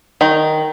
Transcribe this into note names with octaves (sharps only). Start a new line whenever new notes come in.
D#3